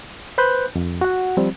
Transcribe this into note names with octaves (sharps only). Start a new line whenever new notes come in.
B4 C5 B5 F#6 G6
F2
F#4 F#5
F3 G3 C4